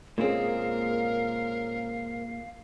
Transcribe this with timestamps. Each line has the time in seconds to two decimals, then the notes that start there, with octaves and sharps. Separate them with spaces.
0.18 A#2 G#3 A#3 C4 C#4 G#4 A#4 F5